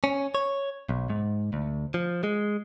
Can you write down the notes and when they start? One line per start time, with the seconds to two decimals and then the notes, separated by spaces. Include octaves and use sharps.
0.04 C#4
0.35 C#5
0.89 B1
1.10 G#2
1.53 D2
1.94 F3
2.24 G#3